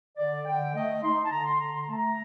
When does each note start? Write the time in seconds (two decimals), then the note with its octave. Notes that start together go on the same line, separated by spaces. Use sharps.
0.17 D3 D5
0.46 D3 G5
0.74 A3 D#5
1.02 D#4 C6
1.24 A5
1.31 D3 A#5
1.45 C6
1.59 D3 A#5
1.73 C6
1.81 A#5
1.88 A3 A5
1.97 A#5